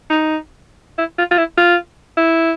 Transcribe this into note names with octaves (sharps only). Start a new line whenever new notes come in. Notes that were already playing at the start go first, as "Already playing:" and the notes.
D#4
E4
F4
F4
E4
F4
E4